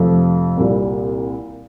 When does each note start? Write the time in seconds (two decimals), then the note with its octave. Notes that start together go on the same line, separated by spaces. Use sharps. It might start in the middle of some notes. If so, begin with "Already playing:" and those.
Already playing: F2 C3 F3 A3
0.57 C2 A#2 G3